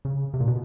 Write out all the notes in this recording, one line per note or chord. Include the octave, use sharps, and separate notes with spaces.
C#3
C3
A#2
B2